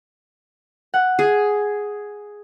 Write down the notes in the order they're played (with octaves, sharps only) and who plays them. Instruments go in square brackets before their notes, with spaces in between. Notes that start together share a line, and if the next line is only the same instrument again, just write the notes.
[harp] F#5
[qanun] G#4